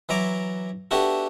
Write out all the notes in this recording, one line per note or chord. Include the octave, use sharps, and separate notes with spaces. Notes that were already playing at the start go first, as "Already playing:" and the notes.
E3 F#3 E4 A#5 D6
B3 D4 E4 F#4 G4 A4